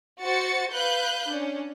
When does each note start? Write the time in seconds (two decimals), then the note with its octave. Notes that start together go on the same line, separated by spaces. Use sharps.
0.24 F#4 C5 A6 C#7
0.75 B4 F5 F#6 G6
1.31 C#4 D4